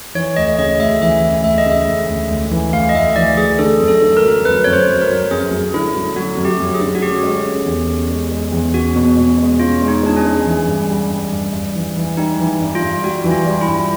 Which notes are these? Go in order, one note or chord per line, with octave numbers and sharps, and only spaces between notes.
E3 C#5
D2 D#5
C#3 D#5
D2 E5
E3 E5
C#3
D2 E5
D#5
C#3
E5
D2
D2
D2
E3
D2 F5
D#5
D2 E5
E3 D5
E3 G#4
D3 A4
F#2
A4
D3
A#4
F#3
F#2 B4
F#2 C#5
C5
F#2
A#4
F#3
F#2 G#4
F#2
D3 E4
F#3
F#3 F#4
F#2
G4
F#2
G#4
D3
F#4
C#4 G4
G#3
C#4
E2
C#4
G#3
G#3
E2
C#4 F#4
B2
B2
G#3
C#4 F4
G#3
D#4
G#3 D4
C#4
G#3
E3
G2
G3
G2
G2
G2
E3
E3
G3 D#4
E3
G2
F4
G2
G3 F#4
E3
F4
G3
E4
G2